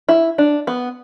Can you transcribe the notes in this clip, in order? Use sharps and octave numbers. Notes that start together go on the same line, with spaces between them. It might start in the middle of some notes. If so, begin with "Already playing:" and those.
E4
D4
B3